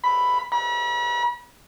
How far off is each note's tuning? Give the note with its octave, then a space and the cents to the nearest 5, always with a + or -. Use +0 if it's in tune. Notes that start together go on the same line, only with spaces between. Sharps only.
B5 +5
B5 -45